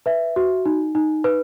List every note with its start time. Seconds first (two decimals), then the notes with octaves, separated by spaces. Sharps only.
0.06 B4 E5
0.36 F#4
0.66 D#4
0.95 D#4
1.24 B4